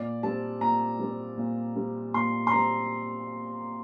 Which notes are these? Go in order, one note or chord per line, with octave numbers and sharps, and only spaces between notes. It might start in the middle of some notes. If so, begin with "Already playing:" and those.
Already playing: A#2 D5
G3 C4 A5
A#2 A#5
G3 C4
A#2
G3 C4
A#2 C6
C6
G3 C4 A#5